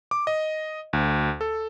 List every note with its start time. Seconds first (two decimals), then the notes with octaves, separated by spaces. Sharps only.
0.11 D6
0.27 D#5
0.93 D2
1.41 A4